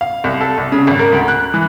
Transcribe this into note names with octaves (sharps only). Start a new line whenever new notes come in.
F5
C2
A4
C2
C#3
G#1
A#4
D2
F#6
E3